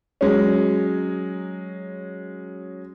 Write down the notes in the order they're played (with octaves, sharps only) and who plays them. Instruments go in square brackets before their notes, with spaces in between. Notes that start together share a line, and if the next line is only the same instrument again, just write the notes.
[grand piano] F#3 G#3 C#4